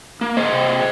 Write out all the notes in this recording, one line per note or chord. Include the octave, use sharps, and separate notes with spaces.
A#3
C5 D#5
C3